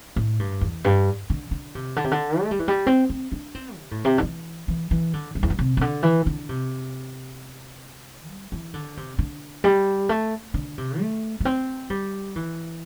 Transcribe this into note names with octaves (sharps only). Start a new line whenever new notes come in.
A2
G2
E2
G2
D3
D3
C3
D3
C3
D3
A3
G3
E3
G3
C4
C4
D4
C4
C3
A2
C3
D3
E3
E3
E3
D3
G2
E2
G2
C3
C3
D3
E3
D3
C3
G3
E3
D3
C3
D3
G3
A3
D3
C3
A3
A3
C4
G3
E3